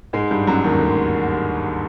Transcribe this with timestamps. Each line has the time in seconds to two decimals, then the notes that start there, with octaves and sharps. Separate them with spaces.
0.13 G#2 G#3
0.31 G2 G3
0.47 F#2 F#3
0.64 D#2 D#3
0.81 D2 D3